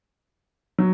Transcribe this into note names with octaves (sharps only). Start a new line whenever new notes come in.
F#3